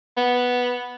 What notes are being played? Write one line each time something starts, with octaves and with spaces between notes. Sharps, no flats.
B3